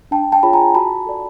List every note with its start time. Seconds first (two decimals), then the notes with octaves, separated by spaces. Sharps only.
0.11 D4 G5 A5
0.32 G5 A5
0.43 F4 G#4 C#5 B5
0.53 G#5 A#5
0.75 F#4 A5 B5
1.06 A4 D5